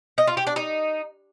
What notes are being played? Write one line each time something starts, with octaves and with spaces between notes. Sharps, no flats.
D#5
F4
G4
D4
D#4